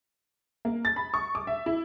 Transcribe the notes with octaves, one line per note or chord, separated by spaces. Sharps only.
A#3
A6
B5
C#6
D6
E5
E4